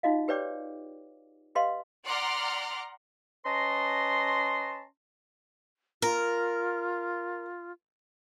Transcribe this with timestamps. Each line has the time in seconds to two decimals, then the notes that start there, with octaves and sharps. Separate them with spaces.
0.03 D#4 F4 F#4 D#5 F5
0.28 G4 B4 C#5 D5 G5 D6
1.55 G4 B4 D#5 F5 C6
2.06 D5 F#5 A#5 C6 D6 F6
3.45 C#4 B4 D#5 A5 A#5 C6
6.02 F4 A#4